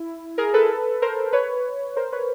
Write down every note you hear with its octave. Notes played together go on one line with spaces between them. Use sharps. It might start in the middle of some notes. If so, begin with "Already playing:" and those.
Already playing: E4
G#4 A#4
A4 B4
A#4 C5
B4 C#5
A#4 C5
B4 C#5